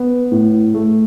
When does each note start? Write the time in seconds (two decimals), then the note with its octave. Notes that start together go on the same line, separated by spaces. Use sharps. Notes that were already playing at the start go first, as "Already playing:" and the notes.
Already playing: B3
0.32 A2
0.74 A3